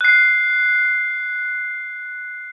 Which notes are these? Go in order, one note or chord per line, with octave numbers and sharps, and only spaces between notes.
F#6 C7